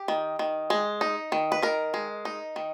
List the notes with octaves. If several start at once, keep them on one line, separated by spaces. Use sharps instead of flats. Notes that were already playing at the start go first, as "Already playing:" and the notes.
Already playing: G4
D#3
D#3
G#3
D#4
D#3
B4
D#3 A#4
G#3
D#4
D#3